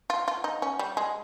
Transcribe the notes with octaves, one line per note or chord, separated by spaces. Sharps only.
F4
F4
D#4
C#4
G3
G#3